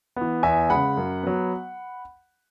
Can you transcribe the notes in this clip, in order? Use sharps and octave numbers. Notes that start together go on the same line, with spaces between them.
E3 B3
E2 E5 G#5
C#3 G#3 F#5 B5
F#2
F#3 B3